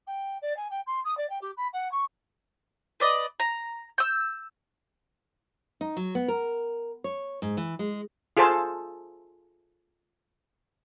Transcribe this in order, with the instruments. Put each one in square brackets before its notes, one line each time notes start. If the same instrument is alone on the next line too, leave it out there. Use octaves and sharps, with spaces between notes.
[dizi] G5
D5
G#5
G5
C6
D#6
D5
G5
G4
B5
F#5
C#6
[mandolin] B4 D5 D#5
A#5
E6 G6
[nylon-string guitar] D#4
F#3
B3
A#4
C#5
G#2
E3
G#3
[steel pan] F4 G#4 A4 C5 A5